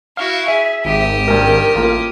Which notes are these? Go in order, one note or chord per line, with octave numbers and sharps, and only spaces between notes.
E4 F#4 F5
G#4 E5
G#1 G4 D#6
G2 C3 A#4
A1 A#3 F4